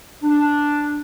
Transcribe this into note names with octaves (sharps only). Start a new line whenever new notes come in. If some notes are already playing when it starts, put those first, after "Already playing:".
D4